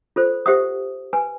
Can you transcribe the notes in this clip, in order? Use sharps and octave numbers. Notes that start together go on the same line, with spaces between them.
F4 A4 C5
G4 C5 E5 F#5 D#6
B4 G#5